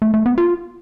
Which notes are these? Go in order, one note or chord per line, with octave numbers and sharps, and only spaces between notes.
A3
A3
B3
F4